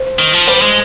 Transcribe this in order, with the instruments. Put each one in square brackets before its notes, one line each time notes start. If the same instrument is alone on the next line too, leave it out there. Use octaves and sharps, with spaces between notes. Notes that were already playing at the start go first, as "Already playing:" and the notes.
Already playing: [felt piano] C5
[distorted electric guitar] D#3
F3
[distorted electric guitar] G3 [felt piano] C5
[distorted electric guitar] G#3